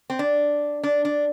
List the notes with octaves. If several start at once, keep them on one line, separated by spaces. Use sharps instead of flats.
C4
D4
D4
D4